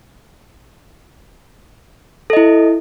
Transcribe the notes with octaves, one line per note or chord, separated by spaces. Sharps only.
E4 A4 D#5